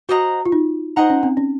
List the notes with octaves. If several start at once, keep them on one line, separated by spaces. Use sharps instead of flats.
F#4 C5 D#5 F#5 A#5
F4
D#4
D#4 C5 D#5 F#5 A#5
C#4
C4
C#4